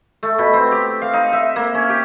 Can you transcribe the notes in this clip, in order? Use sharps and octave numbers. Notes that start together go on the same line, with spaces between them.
A3
B2
C4
G4
F5
D#4
E5
A#3
C#4
G4